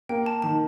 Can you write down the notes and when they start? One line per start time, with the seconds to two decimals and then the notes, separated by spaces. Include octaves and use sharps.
0.09 A#3 G5
0.26 A5
0.42 D#3 A5